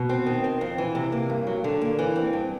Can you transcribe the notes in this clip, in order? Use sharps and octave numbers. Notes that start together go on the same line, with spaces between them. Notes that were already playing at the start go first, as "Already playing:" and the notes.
Already playing: B2
C4
D#3
C4
F2
E3
C3
A#3
G2
F#3
D3
A#3
E3
C4
G2